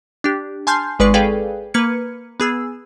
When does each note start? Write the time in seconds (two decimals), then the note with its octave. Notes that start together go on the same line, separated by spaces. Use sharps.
0.24 D4 G4
0.67 G#5 A5 C6 F6 G6 C7
0.99 G#1 G#3 B4 D5 C#6 C7
1.14 G#4 A4 B4 D5 F5 G5
1.74 A#3 B4 F6 G#6 C#7
2.40 B3 G#4 E6